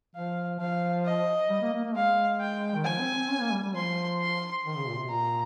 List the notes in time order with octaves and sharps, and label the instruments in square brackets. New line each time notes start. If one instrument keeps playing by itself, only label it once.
[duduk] F3 [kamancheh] F5
[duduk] F3 [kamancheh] F5
[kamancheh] D#5
[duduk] G3
A#3
A#3
A#3
[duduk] G#3 [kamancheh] F5
[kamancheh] G5
[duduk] D#3
[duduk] F3 [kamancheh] G#5
[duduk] C4
C4
C#4
A#3
G3
G3
[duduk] F3 [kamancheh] C6
[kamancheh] C6
[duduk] D#3 [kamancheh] C6
[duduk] C#3
A#2
C3
[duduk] A#2 [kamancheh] A#5